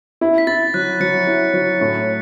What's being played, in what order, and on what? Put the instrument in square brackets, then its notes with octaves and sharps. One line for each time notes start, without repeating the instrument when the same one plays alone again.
[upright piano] E4
[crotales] B6
[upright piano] E4 [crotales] A6
[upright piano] F#3 [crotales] F#6
[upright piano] F#3 [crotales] C#7
[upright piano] E4
F#3
A2